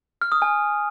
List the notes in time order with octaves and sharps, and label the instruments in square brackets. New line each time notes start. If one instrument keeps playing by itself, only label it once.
[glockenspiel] F6
D#6
G#5